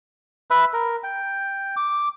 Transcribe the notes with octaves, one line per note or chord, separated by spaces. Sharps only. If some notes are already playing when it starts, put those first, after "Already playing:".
B4 E5 B5
A#4
G5
D6